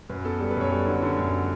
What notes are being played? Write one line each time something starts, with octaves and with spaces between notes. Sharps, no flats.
F#2 B4
B3 A4
G3 A4
B4
F#2 C#5
G3 A4
D3
D3
F#2